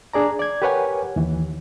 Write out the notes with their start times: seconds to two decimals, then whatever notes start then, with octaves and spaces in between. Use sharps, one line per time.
0.13 D4 G#4 D5 A#5
0.39 D5 G#6
0.62 G4 A#4 B4 C#5 F#5 G#5
1.16 D#2 E3